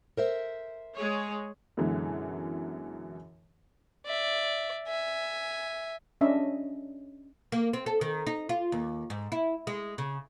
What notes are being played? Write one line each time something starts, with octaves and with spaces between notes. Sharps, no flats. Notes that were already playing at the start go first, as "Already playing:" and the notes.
A#4 C5 E5
G#3 G#4 C#5
F#2 B2 D3 E3 G#3
D5 E5
E5 G#5
C#4 D4 D#5 E5
A#3
C4
A4
D#3
D#4
F4
D#2
G#2
E4
G#3
C#3